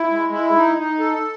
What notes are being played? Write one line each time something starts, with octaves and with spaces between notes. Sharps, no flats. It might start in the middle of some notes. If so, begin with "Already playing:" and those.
Already playing: E4
G#3
E4
D#4
D#4
A4